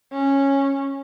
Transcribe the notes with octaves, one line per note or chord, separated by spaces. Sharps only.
C#4